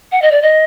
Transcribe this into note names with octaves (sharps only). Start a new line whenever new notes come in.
F#5
D#5
D5
D#5